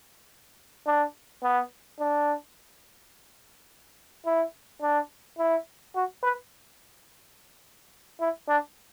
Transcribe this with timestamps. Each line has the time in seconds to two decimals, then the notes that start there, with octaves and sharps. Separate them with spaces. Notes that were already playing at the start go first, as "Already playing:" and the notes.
0.87 D4
1.43 B3
2.00 D4
4.26 E4
4.82 D4
5.38 E4
5.95 F#4
6.23 B4
8.21 E4
8.48 D4